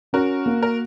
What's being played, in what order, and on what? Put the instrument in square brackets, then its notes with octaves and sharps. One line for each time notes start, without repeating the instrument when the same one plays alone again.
[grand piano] C#4 [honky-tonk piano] F#4 A#4
[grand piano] A#3
[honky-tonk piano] A#4